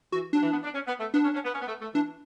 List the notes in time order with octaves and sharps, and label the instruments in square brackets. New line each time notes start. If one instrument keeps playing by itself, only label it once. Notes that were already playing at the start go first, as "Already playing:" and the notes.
[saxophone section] E3 [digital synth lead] F#4
[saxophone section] F#3 [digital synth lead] D4
[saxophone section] E3
B3
D4
C#4
B3
A3
[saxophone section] B3 [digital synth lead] D4
[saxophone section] C#4
C#4
B3
C#4
B3
A3
A3
[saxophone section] E3 [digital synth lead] D4